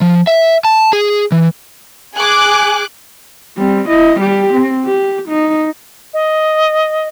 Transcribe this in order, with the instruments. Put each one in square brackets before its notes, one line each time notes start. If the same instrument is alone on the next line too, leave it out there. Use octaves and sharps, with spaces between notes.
[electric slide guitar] F3
E5
A5
G#4
E3
[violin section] G#4 G#5 D6 F#6
[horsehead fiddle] G3 C4
E4 D#5
G3 G4
C4
G4
D#4
[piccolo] D#5